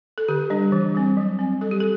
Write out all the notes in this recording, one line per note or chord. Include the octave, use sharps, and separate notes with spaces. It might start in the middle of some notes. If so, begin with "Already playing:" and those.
A4
D3 G4
G3 D4
E3
G3 C4
F#3
C4
G3 A4
G4
A4